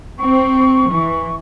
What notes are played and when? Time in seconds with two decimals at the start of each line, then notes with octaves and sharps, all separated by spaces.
0.18 C4 C#6
0.89 E3